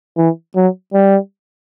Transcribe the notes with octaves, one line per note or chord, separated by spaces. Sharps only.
E3
F#3
G3